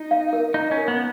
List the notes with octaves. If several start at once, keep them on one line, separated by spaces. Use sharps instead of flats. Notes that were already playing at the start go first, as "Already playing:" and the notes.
Already playing: D#4
F5
A#4
D#4 A#5
C#4
A#4
B3